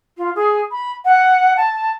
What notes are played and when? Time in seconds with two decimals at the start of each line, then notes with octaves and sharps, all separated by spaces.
0.17 F4
0.35 G#4
0.71 B5
1.05 F#5
1.57 A5